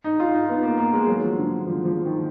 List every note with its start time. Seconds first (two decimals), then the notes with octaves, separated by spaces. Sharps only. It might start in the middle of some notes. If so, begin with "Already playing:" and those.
0.04 D#4
0.20 F4
0.34 D#4
0.49 B3
0.63 A#3
0.78 A#3
0.93 G#3
1.07 F#3
1.23 F3
1.37 D3
1.67 F3
1.85 F3
2.05 D#3